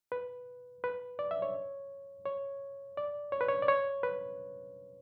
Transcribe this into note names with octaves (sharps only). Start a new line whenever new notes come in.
B4
B4
D5
E5
C#5
C#5
D5
C#5
B4
C#5
D5
C#5
B4